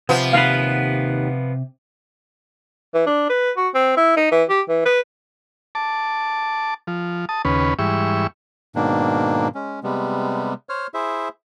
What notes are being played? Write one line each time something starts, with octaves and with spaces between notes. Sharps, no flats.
C3 F3 B3 G4
D#2 B4 F5
E3
D4
B4
F#4
C4
E4
D#4
E3
G4
E3
B4
A5 D6
F3
A5 D#6
D#2 C#3 C#4 B4
G#2 E3 G3 E5 C#6
G#2 B2 D#3 A#3 D4
G#3 C#4
C3 G3 G#3 B3
C5 C#5 F6
E4 G#4 C5 E5